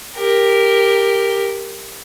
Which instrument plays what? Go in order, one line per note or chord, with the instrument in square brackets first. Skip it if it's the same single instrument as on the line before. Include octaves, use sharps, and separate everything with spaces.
[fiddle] G4 A#4